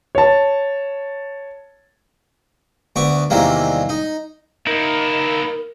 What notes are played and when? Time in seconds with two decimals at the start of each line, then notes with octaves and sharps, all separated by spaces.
0.15 C#5 A5
2.96 D2 B3 C#6 D6
3.30 E2 C3 D#3 E3 G3 A#3
3.89 D#4
4.67 A#3 D#4 E4 A#4